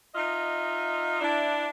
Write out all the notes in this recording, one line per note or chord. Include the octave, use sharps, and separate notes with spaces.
D#4 F4 D#5 E5
D4 E4